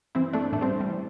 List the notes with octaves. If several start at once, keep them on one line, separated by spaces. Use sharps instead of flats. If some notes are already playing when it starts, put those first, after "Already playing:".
G2 E3 C4 E4
A3 D4
A2 E3 A3 D4
G3 C4
G3
E3